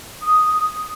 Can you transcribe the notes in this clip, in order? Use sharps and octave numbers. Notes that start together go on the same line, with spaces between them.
D#6